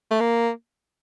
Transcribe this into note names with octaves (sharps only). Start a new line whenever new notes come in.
A3
A#3